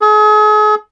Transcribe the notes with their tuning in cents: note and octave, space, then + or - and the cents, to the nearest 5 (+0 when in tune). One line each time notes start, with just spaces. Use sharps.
G#4 +40